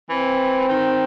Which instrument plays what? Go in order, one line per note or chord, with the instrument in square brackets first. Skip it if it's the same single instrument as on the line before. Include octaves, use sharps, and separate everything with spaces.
[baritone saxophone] E3 [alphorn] C4
[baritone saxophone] D#3